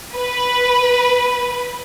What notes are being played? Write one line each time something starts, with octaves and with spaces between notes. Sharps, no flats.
B4